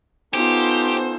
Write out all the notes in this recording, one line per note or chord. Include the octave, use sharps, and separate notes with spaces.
B3 C#4 D#4 F4 G4 A4 C5